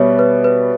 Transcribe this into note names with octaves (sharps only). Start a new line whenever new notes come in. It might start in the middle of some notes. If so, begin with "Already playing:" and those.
Already playing: B2 G3 B4 C#5 E5
B4
B4